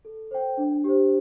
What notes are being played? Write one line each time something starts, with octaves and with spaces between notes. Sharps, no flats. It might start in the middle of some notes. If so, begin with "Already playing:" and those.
A4
C5 G5
D4
G4 C5